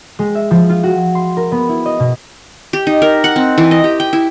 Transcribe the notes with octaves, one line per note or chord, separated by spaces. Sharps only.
G#3
E5
F3
F4
F#4
C6
A#4
B3
E4
D#5
B2
G4
D#4
A#4
F#5
C4
E3
D#5
G4
G5
E4